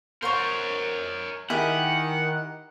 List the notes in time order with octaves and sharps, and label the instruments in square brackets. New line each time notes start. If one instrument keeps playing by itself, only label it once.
[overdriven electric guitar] A#4 C#5 [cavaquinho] C5 F#5 C#6
[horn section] D#3 [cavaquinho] E4 G4 G#4 [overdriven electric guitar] F#5